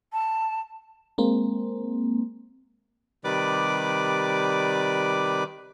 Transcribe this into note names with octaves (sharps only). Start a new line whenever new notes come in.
A5
G#3 A#3 C4
C3 D#3 G3 B4 D5 D6